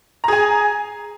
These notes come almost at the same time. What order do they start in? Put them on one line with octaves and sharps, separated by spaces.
A#5 G#4 G#5